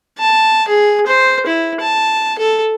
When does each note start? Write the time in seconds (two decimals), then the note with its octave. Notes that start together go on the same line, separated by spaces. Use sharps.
0.19 A5
0.68 G#4
1.07 C5
1.46 E4
1.81 A5
2.39 A4